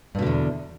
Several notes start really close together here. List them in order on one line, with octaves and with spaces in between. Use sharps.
G2 B2 D3 E2